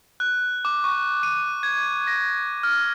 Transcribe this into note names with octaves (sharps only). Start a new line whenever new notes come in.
F#6
D6
C#6
D#7
G#6
A#6
F6